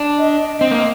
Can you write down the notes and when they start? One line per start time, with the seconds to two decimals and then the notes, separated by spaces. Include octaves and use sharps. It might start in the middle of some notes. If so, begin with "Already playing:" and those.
Already playing: D4
0.18 D#5
0.60 C4 D#5
0.71 A#3